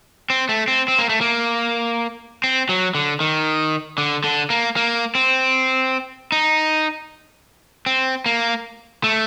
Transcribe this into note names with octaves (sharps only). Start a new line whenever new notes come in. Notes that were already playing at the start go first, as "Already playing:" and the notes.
C4
A3
C4
C4
A#3
A3
A#3
C4
F#3
D3
D#3
D3
D3
A#3
A#3
C4
D#4
C4
A#3
A3